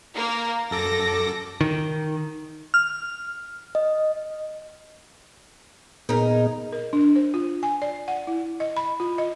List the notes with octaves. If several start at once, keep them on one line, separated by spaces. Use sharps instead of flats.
A#3 A#4
F#2 A4 D6 A#6
D#3
F6
D#5
A#2 B3 D#4 G#4 A#4
A#4
D4
C5
F4
G#5
D5
F#5
E4
D#5
B5
F4
D#5